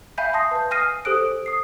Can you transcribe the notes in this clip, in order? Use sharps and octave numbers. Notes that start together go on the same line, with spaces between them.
E5 F5 G#5 B5 G6 B6
F5 A5 C6 D#6 A#6 C7
B4 G6
G#5 D#6 F6 A#6 C7 D#7
G4 A4 C5 D#6 F#6 D7
D#6 C7